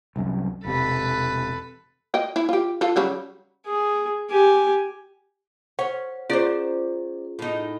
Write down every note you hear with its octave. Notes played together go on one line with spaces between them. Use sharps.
C2 F#2
E1 C3 A4 B4
D#5 G5
E4
F4 G4
F4 A4
C#3 F#3 G3
G#4
G4 G#5
C5 C#5 F#5
C#4 F4 G#4 C5 D5
A2 D#4